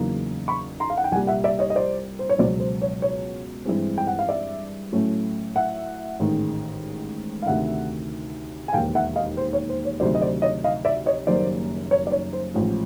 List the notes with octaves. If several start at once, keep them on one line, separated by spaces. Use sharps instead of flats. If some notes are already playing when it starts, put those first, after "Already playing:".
Already playing: E2 C#3 F#3 A#3 D#4
B5 C#6
A#5 C6
F5
F#5
G5
C2 A#2 G3 F#5 G#5
E5 F#5
D5 E5
C#5 D#5
D#5
C5 D5
C5
C#5
C#2 B2 F#3 C5 D5
C5
C#5
C#5
G2 E3 G#3 C4
G5
F#5
F5
D5 E5
A2 F#3 A3 C#4
E5 F#5
A1 G#2 D#3 G#3
F5
D2 C3 D#3 E5 F#5
G#5
E1 D#2 D#3 F5 G5
E5 F#5
D#5 F5
C5
C#5
C5
C#5
D2 C3 D#3 F#3 C5 D5
D#5
C5 D5
C#5 D#5
D#5 F5
D5 E5
C#5 D#5
F#1 F#2 D#3 G3 A#3 C5 D5
C#5
D5
C#5
C5
A1 G#2 F3